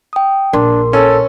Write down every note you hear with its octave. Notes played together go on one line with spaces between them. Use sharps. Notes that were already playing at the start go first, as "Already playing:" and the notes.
G5 D#6
A#1 D4 A#4 C6
C#4 A4